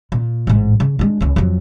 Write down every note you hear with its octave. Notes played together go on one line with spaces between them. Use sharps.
A#2
A1 G#2
C#3
G#3 D4
C#2 C#4
F2 F#3